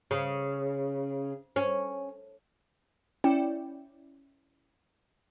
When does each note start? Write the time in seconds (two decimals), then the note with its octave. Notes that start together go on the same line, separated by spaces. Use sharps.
0.11 C#3
1.56 C#4
3.24 C#4 E4 D5 G5